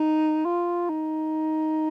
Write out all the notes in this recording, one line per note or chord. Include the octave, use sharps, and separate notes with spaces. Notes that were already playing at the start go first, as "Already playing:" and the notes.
Already playing: D#4
F4
D#4